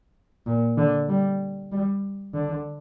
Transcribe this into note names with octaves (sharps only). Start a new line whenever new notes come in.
A#2
D3
G3
G3
D3